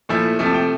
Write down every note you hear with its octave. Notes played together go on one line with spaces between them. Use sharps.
A#2 F3 A3 E4
C3 F3 A3
A5
G5